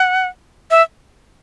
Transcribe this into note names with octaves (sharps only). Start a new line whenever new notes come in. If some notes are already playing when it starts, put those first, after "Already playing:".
Already playing: F#5
E5